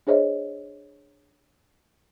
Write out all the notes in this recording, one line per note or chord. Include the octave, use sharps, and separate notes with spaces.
D4 G#4 C5 C#5 D#5 E5